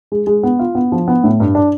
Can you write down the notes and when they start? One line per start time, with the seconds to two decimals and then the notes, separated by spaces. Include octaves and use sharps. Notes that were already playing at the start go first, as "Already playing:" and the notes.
0.12 G#3
0.27 G#3
0.43 B3
0.59 F4
0.75 B3
0.92 F3
1.08 B3
1.24 A2
1.40 G2
1.55 D4